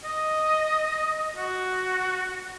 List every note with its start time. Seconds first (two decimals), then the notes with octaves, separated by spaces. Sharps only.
0.04 D#5
1.36 F#4